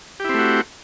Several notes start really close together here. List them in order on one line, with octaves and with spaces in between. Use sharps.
G4 E4 C4 A3 F#4